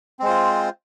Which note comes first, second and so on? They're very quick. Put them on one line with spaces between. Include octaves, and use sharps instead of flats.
C4 G#3 C5 F4